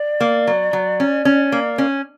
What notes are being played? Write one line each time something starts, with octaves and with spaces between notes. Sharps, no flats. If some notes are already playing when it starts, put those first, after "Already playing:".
Already playing: D5
A#3
F#3
F#3
C#4
C#4
A#3
C#4